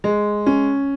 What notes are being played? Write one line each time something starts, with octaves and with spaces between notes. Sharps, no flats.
G#3
C#4